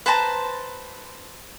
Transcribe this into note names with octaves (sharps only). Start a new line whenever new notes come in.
B4 C5 A5 A#5